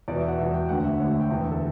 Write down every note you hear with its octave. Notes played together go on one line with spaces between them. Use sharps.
E2 B2 D5
E5
F#5
E2 B2 E5
G5
D2 D3 F#5
F#5
E5
D2 D3 C#5
E5
G5
E2 D3
E5
A4